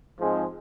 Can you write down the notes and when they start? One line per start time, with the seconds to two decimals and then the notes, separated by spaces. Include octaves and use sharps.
0.18 G#2 F3 G#3 C4